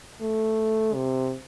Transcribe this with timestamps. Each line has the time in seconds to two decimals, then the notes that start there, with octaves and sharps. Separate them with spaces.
0.21 A3
0.94 C3